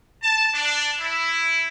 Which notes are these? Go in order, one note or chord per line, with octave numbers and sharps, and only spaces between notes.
A5
D4
E4